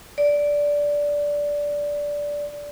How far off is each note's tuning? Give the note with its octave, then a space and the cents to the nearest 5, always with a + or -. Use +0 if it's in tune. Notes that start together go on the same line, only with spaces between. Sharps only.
D5 -10